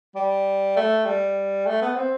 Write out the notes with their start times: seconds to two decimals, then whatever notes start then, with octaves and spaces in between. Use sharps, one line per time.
0.15 G3
0.76 A3
1.06 G3
1.67 A3
1.82 B3
1.96 C4